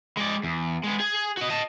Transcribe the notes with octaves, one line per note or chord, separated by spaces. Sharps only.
G#3 D5
E2
G#3 B3
G#4 G#5
F#4 D#5
D#5 A5